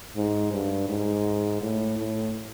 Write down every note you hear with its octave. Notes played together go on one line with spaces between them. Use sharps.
G#2
G2
G#2
A2
A2